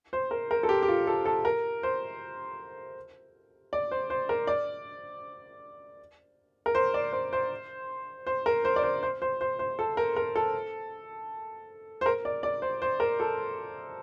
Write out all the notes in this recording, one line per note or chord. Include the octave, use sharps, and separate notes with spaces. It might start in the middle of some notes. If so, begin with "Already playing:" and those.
C5
A#4
A#4
A4
G4
G4
F4
A4
A4
A#4
C5
D5
C5
C5
A#4
D5
A#4
C5
D5
C5
C5
C5
A#4
C5
D5
C5
C5
C5
C5
C5
A4
A#4
A#4
A4
C5
A#4
D5
D5
C5
C5
A#4
A4